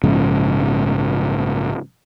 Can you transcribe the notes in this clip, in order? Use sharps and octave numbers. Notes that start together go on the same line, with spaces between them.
A#1 G#2 C#3 F3